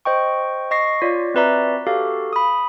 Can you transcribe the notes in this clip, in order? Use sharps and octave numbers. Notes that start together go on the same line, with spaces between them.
C5 D#5 G5 C#6
D#5 C#6 A#6 C7
F4 C#5 D5
C4 F#4 B4 D5 E5 A#5
F#4 G4 A4 F5
B5 D#6